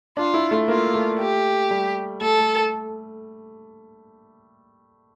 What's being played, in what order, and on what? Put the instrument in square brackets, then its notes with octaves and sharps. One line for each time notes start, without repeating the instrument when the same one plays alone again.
[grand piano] D4 [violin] F4
[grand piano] E4
A3
[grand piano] A#3 [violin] F4
[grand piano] A3
[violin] G4
[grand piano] G3
[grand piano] A3 [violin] A4
[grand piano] A3